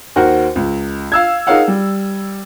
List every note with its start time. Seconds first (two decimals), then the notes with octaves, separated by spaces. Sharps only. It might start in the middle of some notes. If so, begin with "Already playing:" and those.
0.16 D#2 F#4 A#4 C5 F#5
0.56 C#2
1.12 F5 E6 G#6
1.47 D#4 G#4 A#4 C#5 F5 F#5
1.68 G3